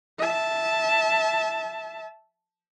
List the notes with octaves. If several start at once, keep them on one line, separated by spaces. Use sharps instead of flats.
E5 A5